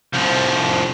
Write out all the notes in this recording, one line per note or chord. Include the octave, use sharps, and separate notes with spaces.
C2 F3